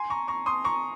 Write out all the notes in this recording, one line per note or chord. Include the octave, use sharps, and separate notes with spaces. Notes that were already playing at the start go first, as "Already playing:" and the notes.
Already playing: G#5 C6
A#5 C#6
A#5 C#6
C6 D#6
A#5 C#6